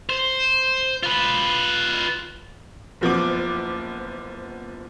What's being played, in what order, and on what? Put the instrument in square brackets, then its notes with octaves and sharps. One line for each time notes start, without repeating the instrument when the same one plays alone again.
[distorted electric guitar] C5
F4 B4
[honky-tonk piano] F#1 F3 B3 D6